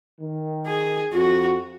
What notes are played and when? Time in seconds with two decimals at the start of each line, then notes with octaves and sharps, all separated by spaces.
0.20 D#3
0.67 G#4
1.13 F2 F#4